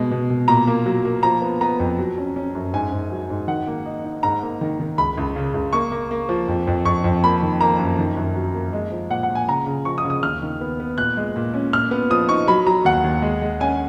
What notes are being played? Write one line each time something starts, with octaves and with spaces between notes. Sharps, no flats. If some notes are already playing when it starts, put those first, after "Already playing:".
Already playing: B2 G#3
B2
B2
A#2 A#5
A#3
F#3
A#3
F3 A#5
B3
B3 A#5
F2
F#3
C#4
C#4
F#2
G#2 G#5
G#2
F#3
G#2
D#3 F#5
A#3
D#4
D#4
G#2 A#5
A#3
D#3
D#3
C#2 B5
C#2
C#3
C#2
A#3 C#6
A#3
A#3
F3
F2
F2
F2 C#6
F2
A#3 B5
D#3
A#3 A#5
F#2
D#3
F#2
F#3
A#3
G#3
F3
A#2 F#5
F#5
A#2
G#5
C#3 A#5
C#3
F3 C#6
D#6
C#3
D#6
D#2 F6
D#3
B3
B3
A#2 F#6
G#3
A#2
C#4
A#2 F6
B3
F3 D#6
D#4 C#6
F#3 B5
F#3 A#5
D#2 F#5
D#2
G#3
G#3
C#4 G#5